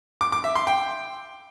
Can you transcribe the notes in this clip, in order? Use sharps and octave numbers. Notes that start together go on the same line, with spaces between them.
D6
D6
E5
C6
G5